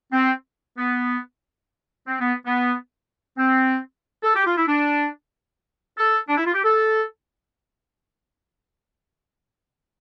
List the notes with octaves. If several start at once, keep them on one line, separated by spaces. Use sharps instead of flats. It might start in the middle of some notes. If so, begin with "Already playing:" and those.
C4
B3
C4
B3
B3
C4
A4
G4
F4
E4
D4
A4
D4
E4
F4
G4
A4